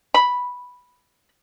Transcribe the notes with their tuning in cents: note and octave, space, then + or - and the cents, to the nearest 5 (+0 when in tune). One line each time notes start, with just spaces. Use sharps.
B5 -5